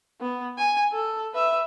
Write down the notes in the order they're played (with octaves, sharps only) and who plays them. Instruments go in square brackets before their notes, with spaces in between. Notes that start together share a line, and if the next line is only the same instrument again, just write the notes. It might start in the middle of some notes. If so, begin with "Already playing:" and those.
[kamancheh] B3
G#5
A4
B4 E5